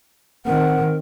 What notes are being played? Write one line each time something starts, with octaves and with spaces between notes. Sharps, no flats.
D#3 C4 A#4 F#5